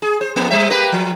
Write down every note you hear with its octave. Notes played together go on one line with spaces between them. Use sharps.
G#4
C5
F2 A#3
G3 C5 E5
A#3 G4 B4
F3